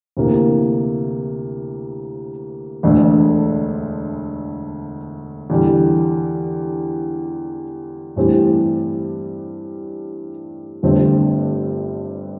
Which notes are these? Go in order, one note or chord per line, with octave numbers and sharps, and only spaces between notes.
D2 C3 E3 A#3
E1 D2 D3 A3 D4
E2 D3 G3
G2 E3 A3 C4 G4
G1 G2 D3 A3 C4